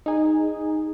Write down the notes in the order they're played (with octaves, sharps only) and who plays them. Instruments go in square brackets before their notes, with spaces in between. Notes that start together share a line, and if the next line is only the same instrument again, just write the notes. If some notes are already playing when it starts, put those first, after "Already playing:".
[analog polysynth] D#4 G#4